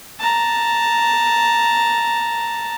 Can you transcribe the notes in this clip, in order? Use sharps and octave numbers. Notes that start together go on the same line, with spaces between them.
A5 A#5